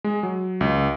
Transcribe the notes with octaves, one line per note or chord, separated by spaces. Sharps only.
G#3
F#3
C#2